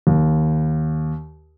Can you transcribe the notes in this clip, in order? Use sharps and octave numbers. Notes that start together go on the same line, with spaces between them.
D#2